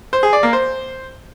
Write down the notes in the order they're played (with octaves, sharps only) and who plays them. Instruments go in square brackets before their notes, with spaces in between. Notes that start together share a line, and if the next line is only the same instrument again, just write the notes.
[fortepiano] C5
G#4
D5
A#3
C5